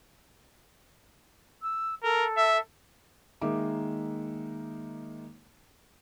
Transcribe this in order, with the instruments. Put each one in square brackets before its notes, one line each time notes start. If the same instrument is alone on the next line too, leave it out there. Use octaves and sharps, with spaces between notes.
[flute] E6
[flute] A4 [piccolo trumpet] A#4
[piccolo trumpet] E5
[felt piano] D#3 G#3 A#3 D#4 E5 D6